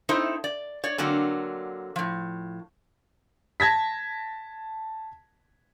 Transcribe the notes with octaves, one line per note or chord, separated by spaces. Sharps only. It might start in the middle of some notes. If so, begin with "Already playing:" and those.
C4 D#4 E4 A4 C5 E5
D5
C#5 D5
D3 F#3 A#3 C4 D4
A2 F3
A5 G#6 A#6 B6